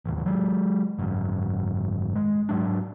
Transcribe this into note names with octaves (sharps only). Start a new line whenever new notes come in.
A1 D#2
F#3 G#3
G#1 F#2
G#3
G#2 F#3 D4